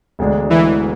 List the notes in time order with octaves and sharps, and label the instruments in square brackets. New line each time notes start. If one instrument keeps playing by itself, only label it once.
[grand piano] E1 D2 D3 G#3 D4
[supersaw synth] E3